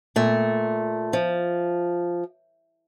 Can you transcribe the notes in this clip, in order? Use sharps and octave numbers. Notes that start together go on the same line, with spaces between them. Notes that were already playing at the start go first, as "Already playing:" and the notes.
A#2 A3
F3